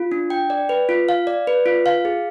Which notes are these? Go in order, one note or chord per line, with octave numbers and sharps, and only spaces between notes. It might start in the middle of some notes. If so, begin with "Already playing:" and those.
Already playing: F4
D4
G5
D5
B4
F4
F5
D5
B4
F4
F5
G#4